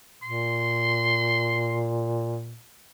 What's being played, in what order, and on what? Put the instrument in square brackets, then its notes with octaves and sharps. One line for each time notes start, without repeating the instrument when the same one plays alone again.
[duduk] A#2 [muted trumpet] C6